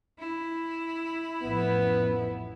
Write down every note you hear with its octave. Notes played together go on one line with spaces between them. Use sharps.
E4
A1 F2 F3 B3